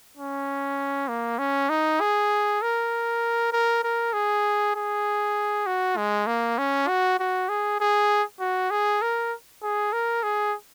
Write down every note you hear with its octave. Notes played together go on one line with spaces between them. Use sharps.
C#4
A#3
C#4
D#4
G#4
A#4
A#4
A#4
G#4
G#4
F#4
G#3
A#3
C#4
F#4
F#4
G#4
G#4
F#4
G#4
A#4
G#4
A#4
G#4